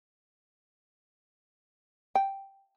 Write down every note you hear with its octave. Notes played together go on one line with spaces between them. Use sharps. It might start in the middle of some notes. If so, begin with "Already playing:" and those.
G5